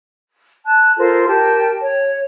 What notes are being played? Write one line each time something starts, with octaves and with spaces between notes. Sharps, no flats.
A5 F#6
F4 A4 A#4 C5
G4 A#4 G5 A5
C#5